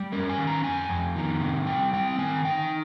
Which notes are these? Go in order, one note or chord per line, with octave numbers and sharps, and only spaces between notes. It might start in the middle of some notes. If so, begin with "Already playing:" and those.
Already playing: G3
C#4 A#4
G#5
D#3
A#5
F2 G#5
F2
D#3
C3
G3 G5
C4 G5
D#3 G#5
D#4 G5